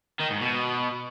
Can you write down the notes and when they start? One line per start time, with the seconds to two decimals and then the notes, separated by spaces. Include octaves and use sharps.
0.20 D#3
0.30 G#2
0.41 B2